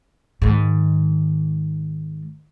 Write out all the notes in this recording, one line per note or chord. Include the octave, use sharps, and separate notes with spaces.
G#2 D#3